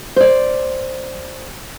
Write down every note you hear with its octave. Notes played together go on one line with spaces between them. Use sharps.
C5 D5